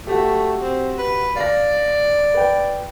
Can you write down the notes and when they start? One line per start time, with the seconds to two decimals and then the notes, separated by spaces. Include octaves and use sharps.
0.07 A3 F#4 G4
0.60 C4
0.98 B4
1.36 D5 F5 A#6
2.34 B4 G5